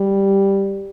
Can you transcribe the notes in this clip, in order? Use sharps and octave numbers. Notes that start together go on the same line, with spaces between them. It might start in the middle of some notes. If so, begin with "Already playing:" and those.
Already playing: G3